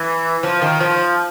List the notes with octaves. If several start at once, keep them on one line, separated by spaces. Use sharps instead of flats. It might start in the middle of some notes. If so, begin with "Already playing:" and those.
Already playing: E3
F3
D#3
F3